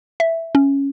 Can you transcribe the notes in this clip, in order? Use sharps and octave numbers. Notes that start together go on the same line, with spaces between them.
E5
C#4